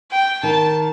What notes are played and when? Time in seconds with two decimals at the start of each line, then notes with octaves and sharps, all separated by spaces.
0.11 G5
0.43 D#3 A5